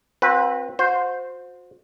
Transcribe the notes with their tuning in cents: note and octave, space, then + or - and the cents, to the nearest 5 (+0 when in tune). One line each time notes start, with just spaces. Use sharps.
C4 +15 F#4 -40 B4 -15
F#4 -40 C5 -5